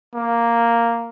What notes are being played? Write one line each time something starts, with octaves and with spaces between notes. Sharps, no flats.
A#3